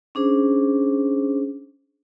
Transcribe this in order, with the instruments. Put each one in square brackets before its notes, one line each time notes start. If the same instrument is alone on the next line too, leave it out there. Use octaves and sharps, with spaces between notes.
[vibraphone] C#4 D4 G#4 C5